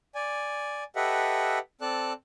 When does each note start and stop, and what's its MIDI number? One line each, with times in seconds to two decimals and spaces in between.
0.15 0.84 74
0.15 0.84 80
0.96 1.59 67
0.96 1.59 69
0.96 1.59 71
0.96 1.59 75
0.96 1.59 76
0.96 1.59 78
1.81 2.13 60
1.81 2.13 69
1.81 2.13 74
1.81 2.13 81
1.81 2.13 90